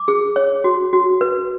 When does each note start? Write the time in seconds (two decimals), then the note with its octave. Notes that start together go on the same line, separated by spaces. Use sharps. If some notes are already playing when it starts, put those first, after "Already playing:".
Already playing: D6
0.08 G#4
0.36 C#5
0.64 F#4
0.93 F#4
1.21 B4